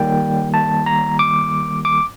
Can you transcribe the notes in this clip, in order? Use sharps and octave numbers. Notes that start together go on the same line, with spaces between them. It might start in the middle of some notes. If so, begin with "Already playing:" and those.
Already playing: D#3 G3 A#3 G5
A5
A#5
D6
D6